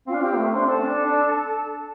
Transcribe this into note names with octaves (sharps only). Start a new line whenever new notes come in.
C4 F4 F5
D4
C4 G4 G5
A3
C5 C6
D4
C4 A4 A5
D4
D4